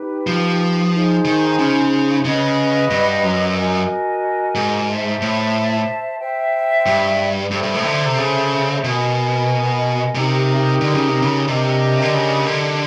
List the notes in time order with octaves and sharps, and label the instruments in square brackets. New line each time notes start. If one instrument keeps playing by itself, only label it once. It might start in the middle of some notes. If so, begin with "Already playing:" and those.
Already playing: [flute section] D#4 G4 B4
[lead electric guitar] F3
[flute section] D#4 G#4 C5
[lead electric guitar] D#3
C#3
[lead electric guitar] C#3 [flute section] B4 D#5 F#5
[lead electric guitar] G2
F#2
[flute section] F#4 A#4 D#5 G#5
[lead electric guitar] G#2
[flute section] C5 E5 A5
[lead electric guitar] A2
[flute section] C5 E5 G5
[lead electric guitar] G2
[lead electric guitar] G2 [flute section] A4 C5 E5
[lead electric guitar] G2
A2
D3
C3
C#3
[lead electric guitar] B2 [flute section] A#4 D#5 G#5
[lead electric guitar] C3 [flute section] D#4 G4 A#4
[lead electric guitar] D3
C#3
C3
C#3
[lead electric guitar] C3 [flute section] D4 G4 A#4 D#5
[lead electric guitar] D3
C#3
D3